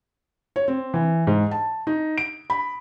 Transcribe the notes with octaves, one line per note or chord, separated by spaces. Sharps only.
C#5
C4
E3
G#2
A5
D#4
D7
B5